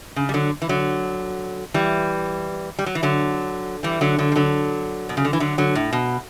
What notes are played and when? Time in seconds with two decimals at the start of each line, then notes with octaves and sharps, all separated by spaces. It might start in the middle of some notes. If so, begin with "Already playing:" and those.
0.16 C#3
0.29 G3
0.34 D3 F#3
0.62 E3
0.69 D3 F#3
1.74 E3 G3
2.79 G3
2.86 F#3
2.95 E3
3.03 D3 F#3
3.83 E3 G3
4.01 D3 F#3
4.19 D3 F#3
4.32 G3
4.36 D3 F#3
5.09 B2
5.17 C#3
5.25 D3
5.33 E3
5.40 D3 F#3
5.58 D3 F#3
5.75 A2
5.93 B2